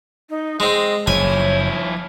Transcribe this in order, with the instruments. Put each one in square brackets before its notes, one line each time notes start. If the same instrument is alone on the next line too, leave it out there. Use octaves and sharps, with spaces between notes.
[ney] D#4
[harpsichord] G#3 C4 [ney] D#5
[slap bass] F#1 [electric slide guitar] F3 E4 [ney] C#5 [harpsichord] G#5